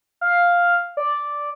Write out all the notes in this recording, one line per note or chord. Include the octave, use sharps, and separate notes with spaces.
F5
D5